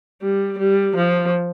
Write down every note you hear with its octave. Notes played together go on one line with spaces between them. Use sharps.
G3
G3
F3